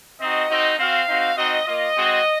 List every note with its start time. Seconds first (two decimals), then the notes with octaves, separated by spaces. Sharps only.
0.20 C4 D#4 F#4 D#5
0.49 C4 D#4 F#4
0.79 C4 F#4 F5
1.07 C4 D#4 F#4
1.37 C4 D#4 F#4 D#5
1.66 A#3 F4 D#5
1.95 G#3 C4 F#4